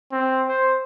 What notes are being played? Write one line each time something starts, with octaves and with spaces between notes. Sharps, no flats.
C4
C5